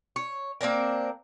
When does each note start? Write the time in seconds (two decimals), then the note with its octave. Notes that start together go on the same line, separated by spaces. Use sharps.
0.16 C#5
0.61 A#3 C4 D4 A#4